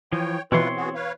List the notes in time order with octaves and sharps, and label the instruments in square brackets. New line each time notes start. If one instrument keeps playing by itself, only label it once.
[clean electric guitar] E3 F3 [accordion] C#5 G5
[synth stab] B2 E3 [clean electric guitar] C4 C#5 C6 [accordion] F4 B4
[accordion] B3 F#4 G#4
B4 C#5 F5